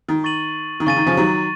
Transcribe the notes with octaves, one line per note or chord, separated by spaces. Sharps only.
D#3
C#6 A6 D#7 F#7
D#3
C#3 C#6 A6 D#7
D#3
C#3 F3
D#3 F#3